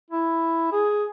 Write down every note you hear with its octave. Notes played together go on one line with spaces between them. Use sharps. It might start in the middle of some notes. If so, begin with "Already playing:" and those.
E4
G#4